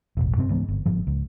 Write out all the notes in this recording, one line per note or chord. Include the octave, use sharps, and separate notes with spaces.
E1 A1
G2 C3 B3 C4
C#2 G#2 E3 B3
G1
G1 G#2 F3
C#2